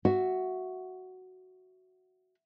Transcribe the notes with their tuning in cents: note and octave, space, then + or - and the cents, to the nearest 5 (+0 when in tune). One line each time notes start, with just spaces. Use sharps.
F#4 +0 E5 +0